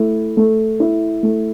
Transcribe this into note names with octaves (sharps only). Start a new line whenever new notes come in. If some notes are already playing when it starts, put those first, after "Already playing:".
Already playing: A3 E4
A3
E4
A3